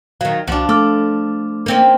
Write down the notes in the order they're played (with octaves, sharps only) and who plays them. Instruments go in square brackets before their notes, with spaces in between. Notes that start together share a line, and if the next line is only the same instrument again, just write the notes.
[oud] D#3 F#3 [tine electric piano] F5
[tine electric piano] C2 [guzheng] F3 D4 [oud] F#4
[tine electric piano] A3 D6 F6 [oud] A4 [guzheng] D5
[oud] A#3 C4 C#4